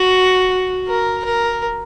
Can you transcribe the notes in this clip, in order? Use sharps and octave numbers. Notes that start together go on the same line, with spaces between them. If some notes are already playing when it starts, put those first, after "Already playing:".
Already playing: F#4
A#4
A#4